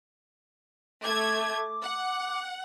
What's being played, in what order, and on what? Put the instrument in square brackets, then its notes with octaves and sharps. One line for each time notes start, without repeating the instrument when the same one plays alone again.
[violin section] A3 G#6 [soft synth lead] D6
[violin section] F#5